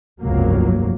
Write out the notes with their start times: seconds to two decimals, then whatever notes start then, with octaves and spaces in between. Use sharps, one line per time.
0.21 F1 C#2 G2 F#3 A#3